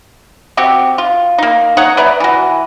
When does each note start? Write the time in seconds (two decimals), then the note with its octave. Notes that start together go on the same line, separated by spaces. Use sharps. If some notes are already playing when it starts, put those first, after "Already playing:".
0.57 C4 F#4 G4
0.98 F4
1.38 A#3 D#4
1.77 D#4 C#5 F#5 A#5
1.97 B4 D5 E5 A#5
2.20 E3 F#4